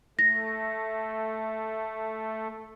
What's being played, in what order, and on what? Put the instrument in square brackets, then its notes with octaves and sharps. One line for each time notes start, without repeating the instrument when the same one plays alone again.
[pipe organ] A3 [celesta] A#6